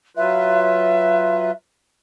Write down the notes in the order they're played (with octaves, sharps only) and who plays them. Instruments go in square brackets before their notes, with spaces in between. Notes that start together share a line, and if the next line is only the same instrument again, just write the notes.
[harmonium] F#3 F4 B4 [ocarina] E5